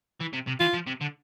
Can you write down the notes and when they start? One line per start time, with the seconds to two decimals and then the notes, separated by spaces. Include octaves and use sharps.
0.21 E3
0.33 C3
0.47 C3
0.60 E3 F4
0.74 F3
0.87 C3
1.01 D3